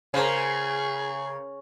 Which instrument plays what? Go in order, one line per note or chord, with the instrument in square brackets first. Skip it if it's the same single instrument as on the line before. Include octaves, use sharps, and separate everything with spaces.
[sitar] C#3 [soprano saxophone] G#4 [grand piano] A#4 C5 C#5